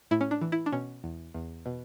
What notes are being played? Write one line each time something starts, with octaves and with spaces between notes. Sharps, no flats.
A2 E4
C#4
D4
E3
E4
D4
B2 C#4
E2
E2
B2